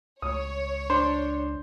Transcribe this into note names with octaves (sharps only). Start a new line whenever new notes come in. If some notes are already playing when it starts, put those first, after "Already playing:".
C#2 C#5 D#6
D4 C5